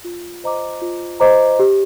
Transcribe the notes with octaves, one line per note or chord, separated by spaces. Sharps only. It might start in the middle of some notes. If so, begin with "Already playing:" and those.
F4
C5 D#5 A#5 D6
F4
C5 D#5 A#5 D6
G4